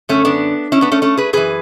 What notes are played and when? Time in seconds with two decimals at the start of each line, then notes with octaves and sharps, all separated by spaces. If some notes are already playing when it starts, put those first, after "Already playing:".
0.09 F#2 D3 A3 C#4
0.25 B3 D4
0.72 C#4 E4
0.81 B3 D4
0.92 A3 C#4
1.02 A3 C#4
1.17 G#4 B4
1.33 F#2 E3 G#4 B4